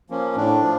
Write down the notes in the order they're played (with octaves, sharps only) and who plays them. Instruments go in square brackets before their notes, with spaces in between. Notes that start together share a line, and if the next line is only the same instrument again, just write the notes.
[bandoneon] F3 A#3 C#4
A2 D4
F3